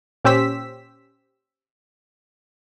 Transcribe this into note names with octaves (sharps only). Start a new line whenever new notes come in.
A#2 C#4 G4 C5 E6 B6